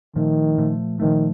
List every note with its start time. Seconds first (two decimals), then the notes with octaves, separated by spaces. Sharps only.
0.16 A#2 D#3 F3 A3
0.58 A#2 F3 A3
1.00 A#2 D#3 F3 A3